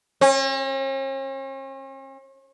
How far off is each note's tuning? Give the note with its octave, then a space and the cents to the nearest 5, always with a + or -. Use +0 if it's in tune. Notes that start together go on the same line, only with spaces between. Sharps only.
C#4 -45